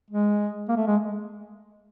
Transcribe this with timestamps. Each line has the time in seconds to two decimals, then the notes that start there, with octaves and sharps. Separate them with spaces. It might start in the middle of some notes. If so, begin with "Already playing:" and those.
0.10 G#3
0.69 A#3
0.76 A3
0.87 G#3